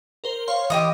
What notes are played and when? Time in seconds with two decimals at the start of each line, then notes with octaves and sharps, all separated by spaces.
0.24 A#4 C5 G7
0.48 C#5 F5 C6
0.70 E3 G4 D#5 D#6